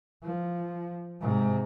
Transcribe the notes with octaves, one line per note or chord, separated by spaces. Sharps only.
F3
G#2 C3